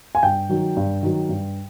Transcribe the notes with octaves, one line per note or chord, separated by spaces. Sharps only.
G#5
G2 G5
D#3 F#3
G2
D#3 F#3
G2